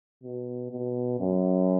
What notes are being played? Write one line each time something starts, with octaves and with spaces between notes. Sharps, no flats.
B2
B2
F#2